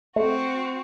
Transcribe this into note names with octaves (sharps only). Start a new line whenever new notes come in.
A3 C4 F#4